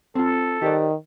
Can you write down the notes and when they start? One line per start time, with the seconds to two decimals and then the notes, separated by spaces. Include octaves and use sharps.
0.15 C4 F4 A4
0.62 D#3 G4 C5 D5